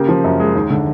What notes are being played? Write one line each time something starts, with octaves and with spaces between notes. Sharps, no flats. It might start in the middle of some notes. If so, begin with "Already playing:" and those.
Already playing: C#3 A#3 G4
F3
F#2
G#3
D#2
D3